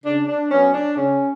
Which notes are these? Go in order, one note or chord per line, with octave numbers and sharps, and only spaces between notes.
C#3 D4
D4
F#3 B3 C#4
D4
C#3 C#4